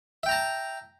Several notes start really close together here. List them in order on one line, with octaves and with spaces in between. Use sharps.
E5 G5 A#5 A5